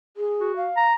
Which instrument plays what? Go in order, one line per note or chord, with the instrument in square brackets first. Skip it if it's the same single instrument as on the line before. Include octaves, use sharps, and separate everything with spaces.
[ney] G#4
[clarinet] F#4
[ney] F5
[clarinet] A#5